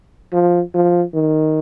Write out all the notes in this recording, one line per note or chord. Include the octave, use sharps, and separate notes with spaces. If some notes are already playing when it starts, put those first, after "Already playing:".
F3
F3
D#3